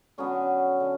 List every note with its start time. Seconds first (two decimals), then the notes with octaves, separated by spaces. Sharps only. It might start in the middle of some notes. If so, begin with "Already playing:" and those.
0.18 D3 F#3 B3 C#4
0.80 D3